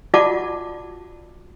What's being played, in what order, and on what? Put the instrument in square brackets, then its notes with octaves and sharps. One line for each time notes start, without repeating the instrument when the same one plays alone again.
[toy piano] F4 F#4 D5 F#5 A5 D6